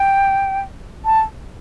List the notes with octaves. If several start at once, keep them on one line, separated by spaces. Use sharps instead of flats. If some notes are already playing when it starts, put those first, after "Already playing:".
Already playing: G5
A5